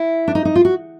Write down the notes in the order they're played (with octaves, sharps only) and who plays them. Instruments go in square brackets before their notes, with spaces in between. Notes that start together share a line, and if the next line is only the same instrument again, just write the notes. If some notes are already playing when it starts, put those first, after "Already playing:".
Already playing: [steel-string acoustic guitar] E4
D4
D#4
D#4
F4
F#4